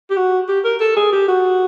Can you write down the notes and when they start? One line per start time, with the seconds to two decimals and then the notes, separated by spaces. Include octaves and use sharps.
0.10 G4
0.17 F#4
0.48 G4
0.64 A#4
0.80 A4
0.96 G#4
1.12 G4
1.28 F#4